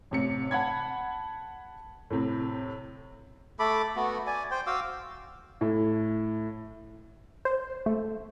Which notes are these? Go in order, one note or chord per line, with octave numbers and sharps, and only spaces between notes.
A1 C3 C#7
F#5 A5 B5 G#6
A2 C3
A3 A4 B5 D6
A3 B3 F#4
D5 G#5
C5 G5
F#4 F5 D6 E6
A2
C5
A3